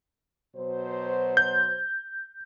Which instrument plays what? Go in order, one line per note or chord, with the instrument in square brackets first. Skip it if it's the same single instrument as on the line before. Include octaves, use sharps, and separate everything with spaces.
[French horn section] B2 F#3 C5
[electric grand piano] G6